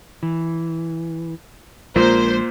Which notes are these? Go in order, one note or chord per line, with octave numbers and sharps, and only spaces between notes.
E3
A#1 A#2 G#3 A#3 A#4 C5